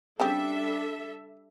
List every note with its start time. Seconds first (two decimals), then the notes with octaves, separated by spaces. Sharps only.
0.20 C#3 G3 C4 D4 G4 A4 E5